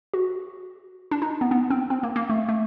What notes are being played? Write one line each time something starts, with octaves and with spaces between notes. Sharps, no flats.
F#4
D4
D#4
B3
B3
C4
C4
A#3
A#3
A3
A3